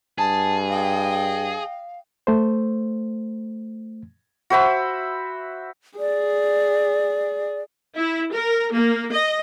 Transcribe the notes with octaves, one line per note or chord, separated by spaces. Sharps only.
G2 G#4 A5
D#5 F5 G5
A3 C5
F#4 C5 E5 B5
G#4 D5
E4
A#4
A#3
D#5